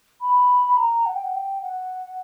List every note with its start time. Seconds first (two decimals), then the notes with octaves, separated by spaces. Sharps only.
0.21 B5
0.77 A#5
1.05 F#5
1.14 G5
1.24 F#5
1.34 G5
1.62 F#5